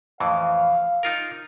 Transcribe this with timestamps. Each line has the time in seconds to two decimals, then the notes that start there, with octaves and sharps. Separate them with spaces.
0.20 F2 A2 E3 F5
1.03 D#4 F4 A#4